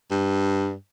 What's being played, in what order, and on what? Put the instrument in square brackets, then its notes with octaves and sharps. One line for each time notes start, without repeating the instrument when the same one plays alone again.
[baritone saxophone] G2